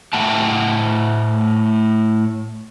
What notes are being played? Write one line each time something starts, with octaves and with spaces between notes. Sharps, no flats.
A2 A3 E5 F#5 G5 A5